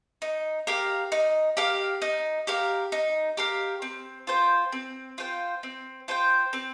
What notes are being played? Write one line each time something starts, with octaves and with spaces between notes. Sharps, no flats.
D#4
G4 A#4 F5
D#4
G4 A#4 F5
D#4
G4 A#4 F5
D#4
G4 A#4 F5
C4
F4 C5 G5
C4
F4 C5 G5
C4
F4 C5 G5
C4